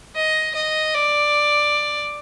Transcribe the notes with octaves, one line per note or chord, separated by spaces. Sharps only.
D#5
D#5
D5